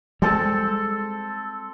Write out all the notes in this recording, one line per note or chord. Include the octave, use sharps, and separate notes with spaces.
G3 G#3 C4 A4 A5